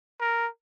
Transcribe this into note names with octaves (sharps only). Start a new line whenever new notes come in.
A#4